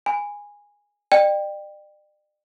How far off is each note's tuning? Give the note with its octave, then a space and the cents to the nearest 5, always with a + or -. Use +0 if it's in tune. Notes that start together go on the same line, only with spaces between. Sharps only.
G#5 -15 B5 +15
D5 +40 G5 +10